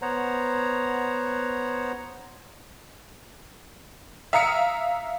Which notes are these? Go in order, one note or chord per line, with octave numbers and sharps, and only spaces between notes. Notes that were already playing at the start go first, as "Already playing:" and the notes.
B3 C5 C#5 F#5 A#5
E5 F5 A#5 D#6 C#7